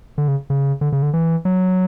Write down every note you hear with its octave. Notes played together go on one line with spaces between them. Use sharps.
D3
C#3
C#3
D3
C#3
D3
E3
F#3